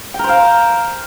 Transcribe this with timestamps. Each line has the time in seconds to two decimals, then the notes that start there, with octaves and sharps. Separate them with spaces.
0.14 G5
0.19 A#4
0.24 C5
0.29 F5